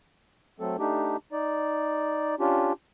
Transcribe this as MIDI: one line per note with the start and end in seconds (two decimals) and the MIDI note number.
0.60 0.77 54
0.60 0.77 57
0.60 0.77 60
0.60 0.77 69
0.79 1.17 57
0.79 1.17 62
0.79 1.17 63
0.79 1.17 67
1.32 2.35 63
1.32 2.35 74
2.40 2.73 61
2.40 2.73 62
2.40 2.73 65
2.40 2.73 67